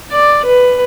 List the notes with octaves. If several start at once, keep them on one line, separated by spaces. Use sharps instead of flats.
D5
B4